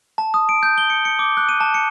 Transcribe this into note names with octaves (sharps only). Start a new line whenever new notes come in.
A5
D#6
D7
G6
G7
C#7
C#7
D6
F#6
D#7
A5
C#7